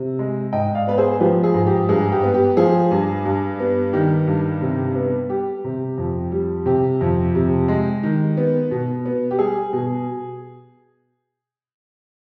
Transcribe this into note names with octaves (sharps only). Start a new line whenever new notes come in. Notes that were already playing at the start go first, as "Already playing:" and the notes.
Already playing: C3
G#3
G#2 D#5 G5
D5 F5
B3 B4
G#4 C5
F3 G4 B4
G#4
G#2
G4
G2 G#4
G4
B3
G4
F3 G#4
G2
G2
B3
D#3 G4
G2
C3
B3
G3 G4
C3
F2
G3
C3 G4
F2
C3
G#3
D#3
B3
B2
B3
G4
G3 G#4
B2